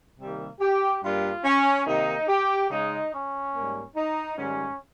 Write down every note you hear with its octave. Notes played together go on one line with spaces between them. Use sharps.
C3 D#3 G3 A#3
G4
G2 G3 A#3 F4
C#4
C3 D#3 A#3 D#4
G4
C#3 G#3 D#4
C#4
G#2 G3 A#3
D#4
G#2 D#3 G3 C#4